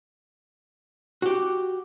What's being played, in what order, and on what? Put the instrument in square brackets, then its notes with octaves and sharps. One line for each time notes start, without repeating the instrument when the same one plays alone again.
[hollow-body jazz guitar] F#4 G4